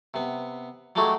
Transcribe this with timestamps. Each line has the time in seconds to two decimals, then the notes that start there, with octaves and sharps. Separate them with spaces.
0.14 C3 B3
0.95 F#3 G#3 A3 D4 F#4 G4